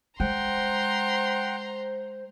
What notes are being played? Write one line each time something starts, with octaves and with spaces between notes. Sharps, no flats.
G#3 C5 F#5 G5 A#5 C6